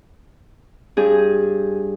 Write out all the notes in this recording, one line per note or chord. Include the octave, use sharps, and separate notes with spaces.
G2 G#4